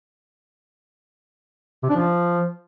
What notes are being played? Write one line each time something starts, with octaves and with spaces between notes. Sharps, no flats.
C3
D4
F3